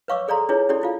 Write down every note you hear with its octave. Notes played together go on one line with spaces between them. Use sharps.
B4 C#5 F5 C#6 D6 E6
G#4 A4 D5 F5 A#5 C6
D4 E4 F4 G#4 B4 C#5
C#4 E4 F#4 G4 A4 D5
E4 F4 F5